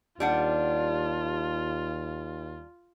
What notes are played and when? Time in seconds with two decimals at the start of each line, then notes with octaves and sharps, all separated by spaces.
0.20 D#2 G3 D4 F4 F#5